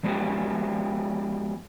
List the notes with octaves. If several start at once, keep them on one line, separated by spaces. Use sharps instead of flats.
F3 G#3 B3 F#4 G4